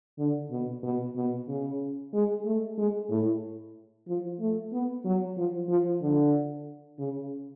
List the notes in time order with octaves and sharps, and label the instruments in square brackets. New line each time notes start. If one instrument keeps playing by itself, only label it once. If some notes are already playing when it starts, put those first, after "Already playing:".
[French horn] D3
B2
B2
B2
C#3
G#3
A3
G#3
A2
F3
A3
B3
F#3
F3
F3
D3
C#3